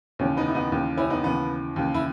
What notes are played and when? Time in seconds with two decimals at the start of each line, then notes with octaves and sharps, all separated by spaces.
0.19 D#2 C#3 E3 C#4
0.37 B3 D#4
0.48 E4
0.54 B3 D#4
0.71 D#2 C#3 E3
0.97 C#4 E4
1.10 B3 D#4
1.23 D#2 C#3 E3 B3
1.76 D#2 C#3 E3
1.94 E4